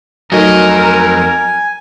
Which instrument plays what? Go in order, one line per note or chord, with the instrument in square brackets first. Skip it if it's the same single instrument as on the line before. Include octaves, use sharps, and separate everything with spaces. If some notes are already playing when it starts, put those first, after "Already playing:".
[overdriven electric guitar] F2 D#5 [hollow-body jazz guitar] F#3 A3 D#4 [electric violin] A#4 [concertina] G#5